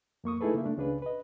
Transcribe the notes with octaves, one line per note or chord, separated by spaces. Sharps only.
F2 A#3 C#6 D#6
A3 D#4 E4 G#4 A4 B4
C#3 A#3 E5
A3 D4
C#2 C#3 D4 G#4 B4
B4 D#5